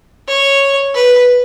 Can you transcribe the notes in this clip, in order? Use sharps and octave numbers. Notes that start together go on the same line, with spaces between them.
C#5
B4